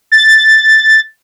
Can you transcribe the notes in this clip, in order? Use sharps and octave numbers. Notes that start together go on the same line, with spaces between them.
A6